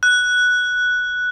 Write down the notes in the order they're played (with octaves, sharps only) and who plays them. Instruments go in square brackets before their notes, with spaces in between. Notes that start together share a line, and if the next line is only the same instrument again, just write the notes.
[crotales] F#6